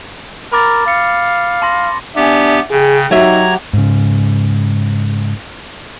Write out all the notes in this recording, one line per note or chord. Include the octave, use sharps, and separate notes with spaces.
A#4 B5 D6 A6
F5 A6 C#7
A5 C6 A#6
B3 D4 G4 E5 G#5
C#3 G#4 G5
F#3 D#4 G4 E5 F#5 A#5 G#6
G#2 C#3